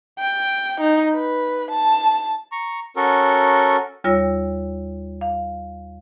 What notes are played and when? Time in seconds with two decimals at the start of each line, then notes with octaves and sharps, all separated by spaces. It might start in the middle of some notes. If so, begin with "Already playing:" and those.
0.19 G5
0.81 D#4
1.14 B4
1.71 A5
2.52 A#5 C#6
2.96 C#4 F#4 A4 A#4
4.04 D#2 G3 F4 C#5 E6 A#6
5.21 F5